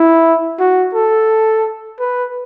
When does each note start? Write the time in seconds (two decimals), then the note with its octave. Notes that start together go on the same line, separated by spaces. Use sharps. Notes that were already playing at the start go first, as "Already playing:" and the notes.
Already playing: E4
0.59 F#4
0.94 A4
2.00 B4